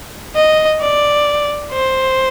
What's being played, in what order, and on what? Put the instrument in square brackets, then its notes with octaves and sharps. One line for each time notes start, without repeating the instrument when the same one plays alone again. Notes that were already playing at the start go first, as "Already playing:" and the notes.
[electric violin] D#5
D5
C5